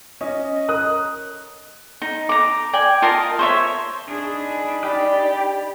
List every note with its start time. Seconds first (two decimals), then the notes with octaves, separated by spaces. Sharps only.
0.21 C#4 D#5
0.68 A#4 D#6 F#6
2.02 D#4
2.29 A#5 D6
2.73 D5 G5 G#5
3.02 F4 A#4 D#5 A5
3.39 C5 C#5 E5
4.08 D4 D#4 G#4 B5
4.84 G4 D5